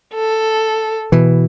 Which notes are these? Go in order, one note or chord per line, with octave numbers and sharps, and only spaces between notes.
A4
B2 E3